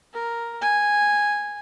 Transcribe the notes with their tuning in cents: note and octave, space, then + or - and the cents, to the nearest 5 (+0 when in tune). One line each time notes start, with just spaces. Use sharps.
A#4 +0
G#5 -5